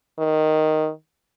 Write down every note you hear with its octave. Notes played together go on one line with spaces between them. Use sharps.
D#3